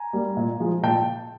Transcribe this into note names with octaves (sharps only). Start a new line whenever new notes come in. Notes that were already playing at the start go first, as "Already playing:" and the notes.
Already playing: G#5 A#5
G3 A#3
A#2
F3 G#3
A#2 G5 A5